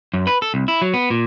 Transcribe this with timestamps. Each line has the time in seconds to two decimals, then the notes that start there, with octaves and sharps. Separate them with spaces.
0.14 F#2
0.27 B4
0.42 A4
0.54 C2
0.68 E4
0.82 F#3
0.94 B3
1.10 A#2